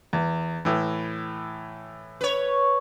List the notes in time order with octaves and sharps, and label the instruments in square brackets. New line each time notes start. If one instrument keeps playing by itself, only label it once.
[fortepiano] E2
A2 E3
[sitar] B4 C#5